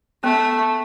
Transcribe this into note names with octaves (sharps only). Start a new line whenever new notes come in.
A3 B3